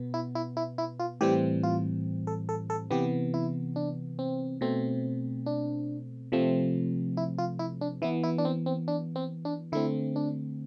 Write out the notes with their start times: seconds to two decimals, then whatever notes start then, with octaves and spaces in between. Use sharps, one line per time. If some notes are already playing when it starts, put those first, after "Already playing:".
Already playing: B2 B3
0.14 E4
0.35 E4
0.57 E4
0.78 E4
1.00 F4
1.21 A2 E3 G3 C4 G4
1.63 F4
2.27 A4
2.49 A4
2.70 A4
2.91 C3 E3 B3 G4
3.34 E4
3.76 D4
4.19 C4
4.61 B2 A3 C4
5.46 D4
6.32 C3 F3 A3 C4
7.17 E4
7.38 F4
7.59 E4
7.81 D4
8.02 E3 B3 E4
8.24 E4
8.38 D4
8.45 C4
8.66 C4
8.88 D4
9.16 C4
9.45 D4
9.72 D3 A3 C4 E4
10.16 D4